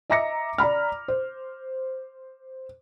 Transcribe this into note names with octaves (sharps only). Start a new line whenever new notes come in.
D#5 E5 A#5 D6 A#6 C#7
D5 A#5 B5 F6
C5